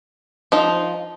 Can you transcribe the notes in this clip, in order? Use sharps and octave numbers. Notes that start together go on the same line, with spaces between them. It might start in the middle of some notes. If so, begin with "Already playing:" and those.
F3 D#4